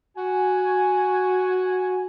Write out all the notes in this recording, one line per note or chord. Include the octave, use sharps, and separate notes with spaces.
F#4 G#5